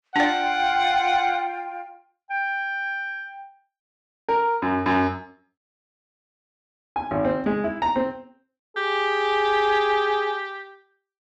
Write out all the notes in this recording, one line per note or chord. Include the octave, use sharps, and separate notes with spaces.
D4 F4 D5 F#5 G5
G5
A#4
F#2
F#2
G#5
G#1
C4
G#3
E4
A#5
C4
G4 G#4